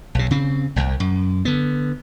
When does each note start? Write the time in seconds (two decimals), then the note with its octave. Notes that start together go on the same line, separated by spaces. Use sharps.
0.15 B1 C3
0.31 C#3 C4
0.76 E1 C2
1.00 F#2
1.45 D3 B3